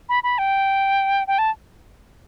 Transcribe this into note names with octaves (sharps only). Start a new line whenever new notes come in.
B5
B5
G5
G5
A5